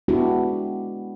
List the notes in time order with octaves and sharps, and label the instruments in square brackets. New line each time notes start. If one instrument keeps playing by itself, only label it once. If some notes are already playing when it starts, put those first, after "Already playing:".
[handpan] G#3 B3 D4 E4 F#4 G4